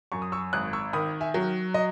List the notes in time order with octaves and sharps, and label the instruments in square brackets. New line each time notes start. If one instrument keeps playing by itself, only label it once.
[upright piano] F#2 [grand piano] C#6
[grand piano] D#6
C#6 E6
[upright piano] G#1 [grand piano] D#6 F#6
[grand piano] C#6 E6
[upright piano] D#3 [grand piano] B5 D#6
[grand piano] E5 G#5
[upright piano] F#3
[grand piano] D#5